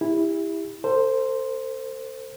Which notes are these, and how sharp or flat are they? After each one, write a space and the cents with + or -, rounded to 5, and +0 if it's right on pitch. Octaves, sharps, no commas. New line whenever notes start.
E4 -5 G4 +30
A4 +45 C5 +0